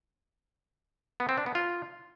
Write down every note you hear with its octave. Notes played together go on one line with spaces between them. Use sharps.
B3
C4
D4
B3
F4